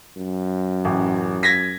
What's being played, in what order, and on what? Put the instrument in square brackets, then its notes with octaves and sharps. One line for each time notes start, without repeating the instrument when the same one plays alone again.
[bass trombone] F#2
[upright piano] A1
G#6 A#6 B6